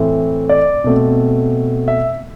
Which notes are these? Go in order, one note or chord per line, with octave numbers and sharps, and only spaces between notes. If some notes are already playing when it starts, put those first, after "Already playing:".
Already playing: A2 E3 A3 C4
D5
B2 A3 C4
E5